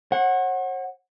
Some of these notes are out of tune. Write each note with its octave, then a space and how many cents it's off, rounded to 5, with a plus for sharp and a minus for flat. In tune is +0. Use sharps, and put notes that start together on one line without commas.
C#5 -45 F#5 +0